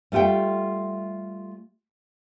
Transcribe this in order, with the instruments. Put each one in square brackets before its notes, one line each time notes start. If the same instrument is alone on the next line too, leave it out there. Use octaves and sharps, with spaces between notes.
[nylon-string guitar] G3 A3 F4 F#5 G5